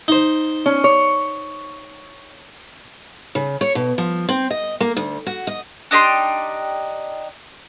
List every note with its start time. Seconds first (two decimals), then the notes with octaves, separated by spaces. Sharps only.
0.08 D#4 C5
0.66 C#4
0.84 C#5
3.35 C#3
3.61 C#5
3.75 B2
3.98 F3
4.29 C4
4.51 D#5
4.80 A#3
4.97 D2
5.26 F#4
5.47 D#5
5.91 D4 D#4 G4 C6